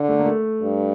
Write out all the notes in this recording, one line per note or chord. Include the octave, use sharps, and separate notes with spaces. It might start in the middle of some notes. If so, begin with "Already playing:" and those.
Already playing: D3
A3
A#3
A3
G2